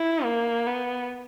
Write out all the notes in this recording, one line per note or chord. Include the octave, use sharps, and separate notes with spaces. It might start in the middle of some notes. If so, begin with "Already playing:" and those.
Already playing: E4
A#3
B3